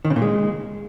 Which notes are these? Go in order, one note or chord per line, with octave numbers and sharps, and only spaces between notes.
D#3
C#3
A#2
G#3